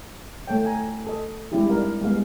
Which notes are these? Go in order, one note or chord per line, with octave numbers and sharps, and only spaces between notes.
A3 A4 C#5 G5
G#5 A#5
A4 D#5
G3 G#3 C4 D4 E4 G4
D4 D#4 A#4 F5
G3 G#3 B3 F5